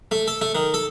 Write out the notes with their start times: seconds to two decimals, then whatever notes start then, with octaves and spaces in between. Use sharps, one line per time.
0.11 A3
0.28 A4
0.41 A3
0.55 D#3
0.74 A4